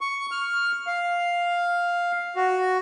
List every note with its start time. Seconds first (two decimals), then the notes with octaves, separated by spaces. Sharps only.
0.01 C#6
0.31 F6
0.87 F5
2.36 F#4